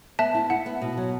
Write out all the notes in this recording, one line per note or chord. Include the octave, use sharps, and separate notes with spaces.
B3 E5 A5
E4
E4 F#5
B3
B2
F#3